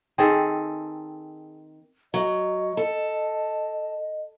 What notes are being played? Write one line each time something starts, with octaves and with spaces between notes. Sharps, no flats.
D#3 C4 G#4 A4
F#3 D#5
A4